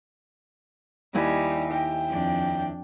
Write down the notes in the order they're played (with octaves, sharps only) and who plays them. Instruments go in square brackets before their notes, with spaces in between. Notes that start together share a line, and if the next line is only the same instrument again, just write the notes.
[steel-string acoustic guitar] D#2 E4 G#5 [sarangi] G3 [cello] D#4 G4
[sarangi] G5
[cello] F2 D4